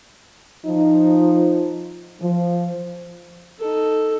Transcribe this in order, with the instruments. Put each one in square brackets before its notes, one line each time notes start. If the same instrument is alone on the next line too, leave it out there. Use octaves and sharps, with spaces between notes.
[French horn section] F3 D#4
F3
[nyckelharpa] D#4 A4